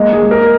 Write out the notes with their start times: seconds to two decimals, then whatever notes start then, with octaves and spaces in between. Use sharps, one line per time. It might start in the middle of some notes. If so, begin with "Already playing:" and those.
Already playing: G#3 A#3 D#5
0.13 G#4
0.23 G#3
0.31 A#4